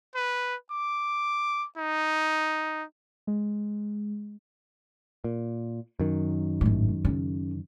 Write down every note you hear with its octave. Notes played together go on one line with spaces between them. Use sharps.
B4
D6
D#4
G#3
A#2
F#2 D#3
G#1 A2
C#3